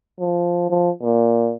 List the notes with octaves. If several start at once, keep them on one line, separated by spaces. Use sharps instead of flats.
F3
F3
A#2